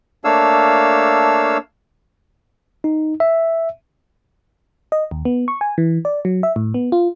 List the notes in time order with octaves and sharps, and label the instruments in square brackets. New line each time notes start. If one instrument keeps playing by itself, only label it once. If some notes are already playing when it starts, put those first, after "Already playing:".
[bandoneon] A3 A#3 D4 C#5 F5 E6
[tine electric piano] D#4
E5
[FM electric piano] D#5
D#2
B3
C#6
G#5
E3
D5
F#3
E5
A2
B3
F4